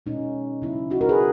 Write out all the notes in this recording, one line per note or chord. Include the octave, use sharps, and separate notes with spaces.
B2 G#3 C#4 D#4
C#3 F#3 B3 E4
D#4 F#4
F#4 A#4
G#4 B4